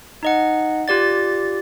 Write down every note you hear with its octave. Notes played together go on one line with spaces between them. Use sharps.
D#4 D#5 F#5
F4 G4 D5 A6